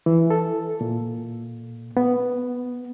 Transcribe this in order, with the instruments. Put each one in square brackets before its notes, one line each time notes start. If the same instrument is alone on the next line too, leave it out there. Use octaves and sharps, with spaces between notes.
[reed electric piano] E3
A4
A#2
B3